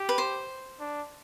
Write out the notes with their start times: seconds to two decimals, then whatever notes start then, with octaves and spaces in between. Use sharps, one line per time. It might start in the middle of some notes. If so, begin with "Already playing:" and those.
Already playing: G4
0.09 B4
0.18 C5
0.80 D4